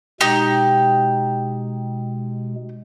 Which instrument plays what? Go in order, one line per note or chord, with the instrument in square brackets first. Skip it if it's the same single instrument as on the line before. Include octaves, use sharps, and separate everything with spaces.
[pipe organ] B2 G#3 [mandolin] D#4 G4